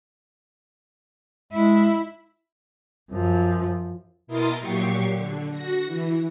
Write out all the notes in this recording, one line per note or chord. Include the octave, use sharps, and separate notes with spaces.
G#3 E4
F#2 F3
B2 E4 A#4 C6 D#6 A6
A#2 F#3 G4 C#6 C7
D3
F#4 A#6
E3